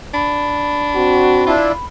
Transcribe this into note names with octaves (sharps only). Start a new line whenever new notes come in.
D4 B5
C4 F#4
D4 E4 F4